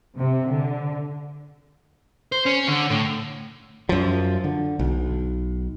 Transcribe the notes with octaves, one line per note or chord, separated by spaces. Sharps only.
C3
D3
C5
C#4
D3
A2
F#2 F3
D3
B1